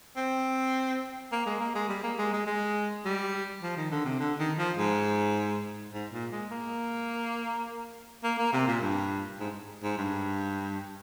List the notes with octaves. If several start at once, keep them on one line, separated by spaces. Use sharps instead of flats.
C4
A#3
G#3
A#3
G#3
G3
A#3
G#3
G#3
G#3
G3
F3
D#3
D3
C3
D3
D#3
F3
G#2
G#2
A#2
G#3
A#3
A#3
A#3
C3
A#2
G2
G#2
G#2
G2